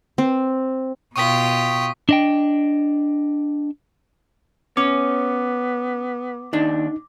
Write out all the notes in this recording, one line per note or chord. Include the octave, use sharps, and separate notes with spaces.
C4
B2 F4 G5 C#6 D#6 B6
D4 D#5 G5
B3 C#4 C#5 D6
D#2 D4 D#4